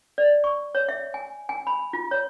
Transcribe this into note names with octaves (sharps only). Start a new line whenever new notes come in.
D5
C#6
C#5
E5
G#5
G#5
B5
F4
C#5